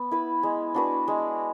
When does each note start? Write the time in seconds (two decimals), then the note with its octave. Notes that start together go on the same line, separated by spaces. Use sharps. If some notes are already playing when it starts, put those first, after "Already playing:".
Already playing: B3
0.11 E4 B4
0.43 G#3
0.75 D4 F#4 B4
1.08 G#3